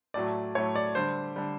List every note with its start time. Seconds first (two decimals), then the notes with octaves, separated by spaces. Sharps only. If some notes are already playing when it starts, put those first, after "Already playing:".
0.14 A2 F#3 A3 D5
0.55 A2 F#3 A3 C#5
0.76 D5
0.95 D3 G3 C5
1.36 D3 G3